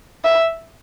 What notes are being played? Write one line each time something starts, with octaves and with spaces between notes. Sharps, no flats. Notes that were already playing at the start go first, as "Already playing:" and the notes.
E5